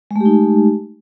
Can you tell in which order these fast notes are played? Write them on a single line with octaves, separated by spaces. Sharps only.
G#3 A3 G4 D#4